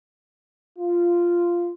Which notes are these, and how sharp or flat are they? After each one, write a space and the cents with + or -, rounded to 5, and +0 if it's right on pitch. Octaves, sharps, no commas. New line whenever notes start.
F4 -10